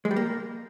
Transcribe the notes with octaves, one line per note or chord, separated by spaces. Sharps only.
G#3
G3
A#3